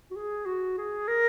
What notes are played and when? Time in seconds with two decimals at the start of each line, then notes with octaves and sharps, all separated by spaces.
0.11 F#4
0.16 G#4
0.46 F#4
0.78 G#4
1.08 A#4